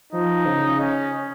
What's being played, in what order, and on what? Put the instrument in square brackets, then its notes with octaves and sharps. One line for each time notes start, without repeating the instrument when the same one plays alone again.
[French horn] F3 [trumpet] D#4
[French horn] C#3
[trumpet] C#4